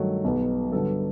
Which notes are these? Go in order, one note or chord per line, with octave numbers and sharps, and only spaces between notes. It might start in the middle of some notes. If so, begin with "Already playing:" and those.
Already playing: G2 D#3 F#3 A3
B1 B2 G3 B3
G2 D3 F#3 B3 A4